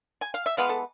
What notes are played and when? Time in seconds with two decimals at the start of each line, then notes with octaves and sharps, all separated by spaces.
0.21 G#5
0.34 F5
0.46 E5
0.57 E3 G#3 B3 F5
0.69 A4